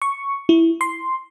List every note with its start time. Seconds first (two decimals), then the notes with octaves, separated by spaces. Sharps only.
0.02 C#6
0.49 E4
0.81 C6